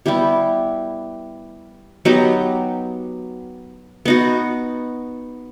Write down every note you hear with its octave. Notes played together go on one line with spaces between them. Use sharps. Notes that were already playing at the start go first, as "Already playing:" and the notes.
G3 B3 E4 G4
F#3 B3 D#4 G4
B3 D#4 F#4